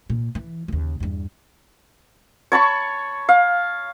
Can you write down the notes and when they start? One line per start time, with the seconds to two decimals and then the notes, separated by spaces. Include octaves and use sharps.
0.10 A#2
0.35 E3
0.68 D#2 C#3
1.00 E2 G2
2.52 C#5 A5 B5 C#6
3.29 F5